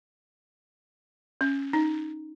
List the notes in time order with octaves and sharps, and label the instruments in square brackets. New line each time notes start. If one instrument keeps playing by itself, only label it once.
[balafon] C#4
D#4